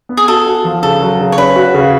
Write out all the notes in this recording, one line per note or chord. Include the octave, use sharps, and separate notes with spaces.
B3
G#4
F#4 A4
F#4
F3
C#3 A4
F#3
C#3
C#5
C#4 B4
F#4
C#3